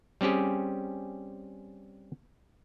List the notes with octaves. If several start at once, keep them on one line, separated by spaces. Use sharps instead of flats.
G3 C4 C#4 G4 G#4